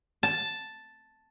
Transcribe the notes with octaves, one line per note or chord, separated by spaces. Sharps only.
A5